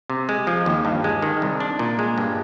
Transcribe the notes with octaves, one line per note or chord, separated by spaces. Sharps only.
C3
G#3
F3
D#2
G2
G#3
D#3
C2
D4
A#2
G#3
G2